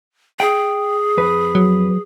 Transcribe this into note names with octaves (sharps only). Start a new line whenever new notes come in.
G#4 G5
F2 B4
F#3